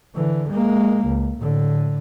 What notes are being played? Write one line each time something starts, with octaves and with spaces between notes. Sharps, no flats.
D3 E3
G#3 A#3
C#2
A2 D3